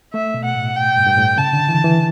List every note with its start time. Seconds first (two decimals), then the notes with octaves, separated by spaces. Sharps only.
0.13 A3 E5
0.34 B2
0.45 F#5
0.55 A2
0.76 G5
0.96 G2
1.06 G2
1.17 A2
1.37 C#3 A5
1.53 D3
1.68 E3
1.84 E3